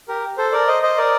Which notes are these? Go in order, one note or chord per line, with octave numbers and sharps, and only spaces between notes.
G4 A#4
A4 C5
A#4 D5
C5 D#5
C5 D#5
A#4 D5